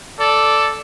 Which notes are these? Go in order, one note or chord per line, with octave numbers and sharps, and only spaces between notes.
A4 D5